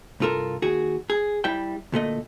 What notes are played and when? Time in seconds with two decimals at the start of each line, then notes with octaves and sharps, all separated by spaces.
0.20 C2 G2 F4 A4 A#4
0.62 D#2 F#4 G#4
1.10 G#4
1.44 G3 E4 E5 G5
1.92 D2 A#2 A3 D#5